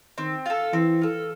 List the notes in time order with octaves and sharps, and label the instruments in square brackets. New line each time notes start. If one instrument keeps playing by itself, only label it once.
[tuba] D#3 [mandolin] C4
[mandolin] F4 A4
[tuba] E3 [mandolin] C4
[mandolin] F4 A4